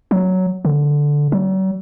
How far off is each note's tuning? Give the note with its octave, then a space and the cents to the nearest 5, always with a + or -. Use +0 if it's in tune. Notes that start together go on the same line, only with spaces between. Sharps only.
F#3 +5
D3 -5
F#3 +45